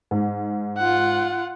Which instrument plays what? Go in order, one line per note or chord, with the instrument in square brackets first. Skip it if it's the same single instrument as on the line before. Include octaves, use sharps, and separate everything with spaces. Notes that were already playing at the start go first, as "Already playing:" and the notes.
[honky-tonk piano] G#2
[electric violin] F4 F#5